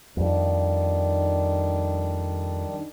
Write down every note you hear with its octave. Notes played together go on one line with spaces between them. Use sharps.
F2 D#3 G3 D4